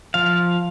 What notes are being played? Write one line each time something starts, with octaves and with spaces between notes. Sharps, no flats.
F3 F5